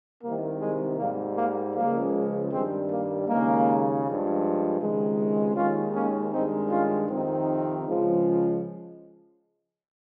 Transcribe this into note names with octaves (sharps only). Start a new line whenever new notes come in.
C2 C3 D#3 A#3
G#3
G#2 G3 A#3
A#3
C#2 C#3 F3 G#3 A#3
G2 D#3 G3 G#3 C4
A#3
D#2 C#3 G#3 A#3
G2 F3 G#3
C#2 C3 D#3 G#3
D#2 D#3 G#3 C#4 F4
A#3 C#4
G2 D#3 G#3 C4 D#4
C#4 F4
F2 C3 D#3 C4 D#4
C#2 C#3 F3 G#3